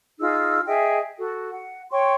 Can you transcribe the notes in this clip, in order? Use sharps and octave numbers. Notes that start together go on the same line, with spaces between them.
D#4 F4 G#4 E6
G#4 D#5 E5 G5
F#4 A4
F#5
C#5 G5 C6 C#6